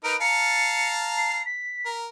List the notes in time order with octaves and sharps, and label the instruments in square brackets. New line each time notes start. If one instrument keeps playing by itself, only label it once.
[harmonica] D#4 A#4 B4 [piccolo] D7
[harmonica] F5 A5 A#5 [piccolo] C#7
[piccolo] C7
B6
[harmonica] A#4